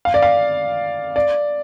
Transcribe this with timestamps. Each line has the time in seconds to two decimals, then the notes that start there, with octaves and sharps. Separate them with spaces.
0.05 F5
0.14 D5
0.22 F5
1.16 D5